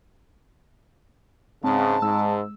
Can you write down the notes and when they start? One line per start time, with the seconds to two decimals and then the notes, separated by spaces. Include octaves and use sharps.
1.64 G#2 C#3 C4 A5
2.02 G#2 G#3 E6